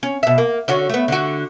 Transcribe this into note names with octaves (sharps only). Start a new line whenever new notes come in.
C#4
B2 E5
A#3
D3 C#4 F#4
A3 B3
D3 F#4